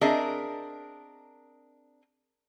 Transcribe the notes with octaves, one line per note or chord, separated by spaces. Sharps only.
C4 D4 G#4 A#4 D#5 E5